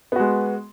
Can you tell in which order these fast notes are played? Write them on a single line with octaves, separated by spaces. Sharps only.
B3 F#4 G#3